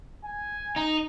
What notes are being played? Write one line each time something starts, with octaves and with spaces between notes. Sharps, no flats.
G#5
D#4